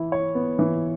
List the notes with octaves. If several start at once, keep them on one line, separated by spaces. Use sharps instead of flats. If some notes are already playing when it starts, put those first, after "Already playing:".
Already playing: E3 E4
C#5
B3
E3